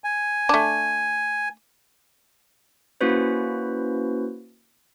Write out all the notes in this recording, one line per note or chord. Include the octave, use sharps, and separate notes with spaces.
G#5
A3 D4
A#3 C#4 E4 F#4 B4 C5